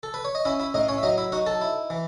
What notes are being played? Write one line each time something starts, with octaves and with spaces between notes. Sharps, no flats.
A4
B4
C#5
D#5
C#4 E4 E5
E4 E5
A2 D#4 D#5
C#4 C#5
E5
F#3 D#4 D#5
E4 E5
D#4 F#4 F#5
A4 A5
E4
E3